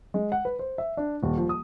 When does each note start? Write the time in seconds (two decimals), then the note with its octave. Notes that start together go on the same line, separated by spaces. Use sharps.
0.14 G#3
0.32 F#5
0.45 B4
0.59 C5
0.78 E5
0.97 D4
1.23 D#1
1.37 F3
1.49 D#6